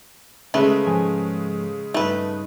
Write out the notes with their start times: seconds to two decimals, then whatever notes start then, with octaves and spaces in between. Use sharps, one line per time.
0.54 C#3 G#3 A3 B4
0.86 G#2 F3 G#5
1.94 G2 A3 D#4 B4